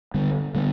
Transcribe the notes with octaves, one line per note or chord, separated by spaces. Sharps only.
D3 G3 B3
D3 G3 B3